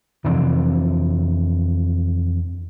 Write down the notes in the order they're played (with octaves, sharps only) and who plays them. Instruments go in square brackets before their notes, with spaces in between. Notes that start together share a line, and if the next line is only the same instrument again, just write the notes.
[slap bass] F2 C3 E3 D4